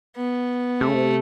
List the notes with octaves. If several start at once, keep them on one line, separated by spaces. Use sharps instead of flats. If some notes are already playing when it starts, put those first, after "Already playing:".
B3
C3 A3
C#3
C3